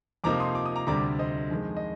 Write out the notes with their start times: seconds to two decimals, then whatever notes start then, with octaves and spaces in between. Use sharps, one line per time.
0.24 F2 C3 F3 A#3 D#4 A#5 D6
0.40 C6 D#6
0.55 D6
0.66 D#6
0.76 A#5 D6
0.87 D2 C3 G3 D4 A#5 D6
1.19 C5 D#5
1.51 F2 D#3 G#3
1.77 D#5